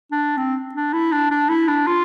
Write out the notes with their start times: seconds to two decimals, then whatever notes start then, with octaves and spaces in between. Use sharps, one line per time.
0.12 D4
0.37 C4
0.74 D4
0.93 E4
1.12 D4
1.31 D4
1.49 E4
1.68 D4
1.87 F4